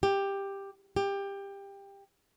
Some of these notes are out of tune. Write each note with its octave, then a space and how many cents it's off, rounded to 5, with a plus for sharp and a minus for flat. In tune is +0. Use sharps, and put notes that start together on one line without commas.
G4 +10
G4 +20